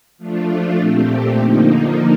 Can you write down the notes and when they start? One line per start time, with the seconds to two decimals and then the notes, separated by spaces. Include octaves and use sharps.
0.18 F3 A3 D4 F4
0.77 A#2 A3 C4 G4
1.36 D3 F3 A#3 D#4